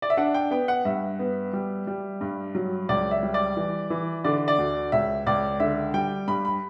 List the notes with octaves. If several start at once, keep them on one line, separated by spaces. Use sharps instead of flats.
D5
E5
D4 F#5
G5
B3 G5
F#5
G2 E5
B3
G3
G3
G2
F#3
C#2 D5
E5
G3
D5
E3
E3
D3 D5
D5
D2
C#2 E5
C#2 D5
D3 E5
G3 G5
G2 B5
B5